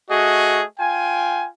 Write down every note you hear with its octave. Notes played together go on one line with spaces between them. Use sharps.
A3 F#4 G#4 D#5
F4 G5 G#5